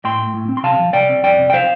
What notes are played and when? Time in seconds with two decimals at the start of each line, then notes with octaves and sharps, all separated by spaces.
0.05 A2 G5 C6
0.19 A3
0.34 A2
0.49 C4
0.57 C6
0.63 C3 F5 A5
0.79 F3
0.93 C3 D5 G5
1.09 C4
1.23 F2 D5 G5
1.39 C3
1.50 G5
1.53 C5 F5